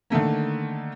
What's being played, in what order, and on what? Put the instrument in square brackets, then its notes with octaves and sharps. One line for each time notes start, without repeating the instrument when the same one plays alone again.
[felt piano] D3 D#3 A3 A#3